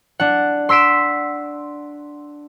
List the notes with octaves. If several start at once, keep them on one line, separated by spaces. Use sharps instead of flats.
D4 F#5
C6 E6 B6 D7 E7